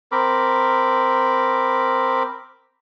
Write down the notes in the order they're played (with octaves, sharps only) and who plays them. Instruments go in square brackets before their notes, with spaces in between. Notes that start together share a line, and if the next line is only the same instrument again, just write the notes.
[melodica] C4 A#4 B5 D6